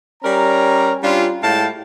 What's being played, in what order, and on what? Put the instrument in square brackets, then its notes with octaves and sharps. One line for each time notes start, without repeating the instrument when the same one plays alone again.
[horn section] G3 C#4 A#4 D5 A#5
G3 C#4 D4 F4
A2 G#3 E4 F5 G5 A5